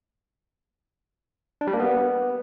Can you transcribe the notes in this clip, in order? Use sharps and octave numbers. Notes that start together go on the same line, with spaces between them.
D4
G3
A#3
B3